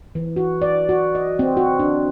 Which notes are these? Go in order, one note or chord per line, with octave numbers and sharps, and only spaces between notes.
E3
F#4
D5
F#4
D#5
C4
F#4
D4